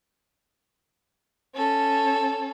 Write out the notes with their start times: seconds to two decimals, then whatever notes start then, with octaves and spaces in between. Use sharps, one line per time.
1.55 C#4 A4